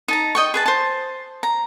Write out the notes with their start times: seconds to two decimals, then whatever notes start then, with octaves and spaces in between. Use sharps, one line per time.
0.08 D#4 A5 A#5
0.35 D#5 G5 C#6
0.54 G#4 B4 A5
0.66 C5 A5
1.43 A#5